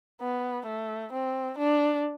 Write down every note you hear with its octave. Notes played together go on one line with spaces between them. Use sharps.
B3
A3
C4
D4